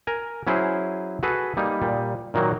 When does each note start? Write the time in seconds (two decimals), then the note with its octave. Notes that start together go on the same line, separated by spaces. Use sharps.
0.07 A#4 G#5
0.47 F#3 C#4 E4 G#4 C5
1.23 F#4 G#4 A4 B4
1.57 G3 A#3 D#4
1.82 A#2 G3
2.34 A#2 D#3 F#3 A#3